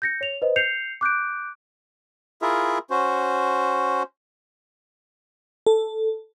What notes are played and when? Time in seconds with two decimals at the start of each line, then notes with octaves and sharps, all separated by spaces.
0.02 G6 A#6 C#7
0.21 C#5 F7
0.42 B4 C5 D#5
0.56 G6 C7 C#7 F7
1.01 D6 F#6 G6 D7
2.42 E4 F4 G#4 A#4 E5
2.90 C#4 F#4 C5
5.67 A4